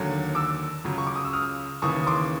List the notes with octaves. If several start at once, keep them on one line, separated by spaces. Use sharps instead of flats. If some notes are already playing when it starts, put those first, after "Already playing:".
Already playing: D#2 D3 F#3
D6 E6
C#2 C#3 F#3
C#6
D6
D#6
E6
D#6 F6
D#2 C#3 E3 C#6 D#6
C6 D6